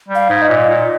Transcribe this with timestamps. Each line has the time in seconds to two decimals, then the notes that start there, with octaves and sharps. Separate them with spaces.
0.08 G3
0.15 F5
0.29 G#2
0.42 D#5
0.49 A#2
0.69 A#2